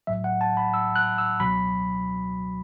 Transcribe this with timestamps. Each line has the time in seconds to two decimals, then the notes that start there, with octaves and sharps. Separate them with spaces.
0.07 B1 A2 F#3 E5
0.24 F#5
0.41 A5
0.57 B5
0.74 E6
0.96 F#6
1.18 E6
1.40 C#2 B2 F#3 B5